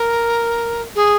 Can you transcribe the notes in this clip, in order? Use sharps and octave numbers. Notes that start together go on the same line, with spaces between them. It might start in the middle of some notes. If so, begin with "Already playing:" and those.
Already playing: A#4
G#4